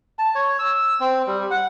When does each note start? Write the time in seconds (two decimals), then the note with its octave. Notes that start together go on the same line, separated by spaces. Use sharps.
0.19 A5
0.35 C#5
0.59 E6
1.00 C4
1.27 G3
1.51 F#5